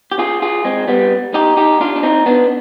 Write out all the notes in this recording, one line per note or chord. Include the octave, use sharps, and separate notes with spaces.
G4
F4 G#4
F4 G#4
G#3 C4
G3 B3
D#4 G4
D#4 G4
D4 F4
D4
C4 D#4
B3 D4